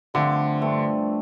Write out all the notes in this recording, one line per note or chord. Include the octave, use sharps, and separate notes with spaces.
G2 D3 F3 A3 C4
G2 F3 A3 C4